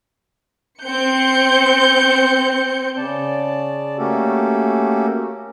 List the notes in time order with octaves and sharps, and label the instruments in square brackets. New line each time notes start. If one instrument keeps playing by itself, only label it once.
[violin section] C4 G6 C#7
[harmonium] C#3 D5 A5
A3 A#3 C#4 F#4 G4 A4